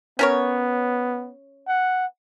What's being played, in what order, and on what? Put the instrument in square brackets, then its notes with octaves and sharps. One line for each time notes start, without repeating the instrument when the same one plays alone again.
[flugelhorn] B3 [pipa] C#4 A#4 C#5
[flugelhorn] F#5